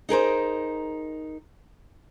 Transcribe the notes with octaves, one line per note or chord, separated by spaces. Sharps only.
D#4 G#4 A#4 C5